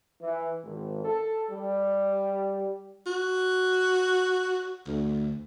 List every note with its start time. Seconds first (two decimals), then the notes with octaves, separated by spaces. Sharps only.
0.22 E3
0.63 G#1
1.04 A4
1.51 G3
3.07 F#4
4.88 D2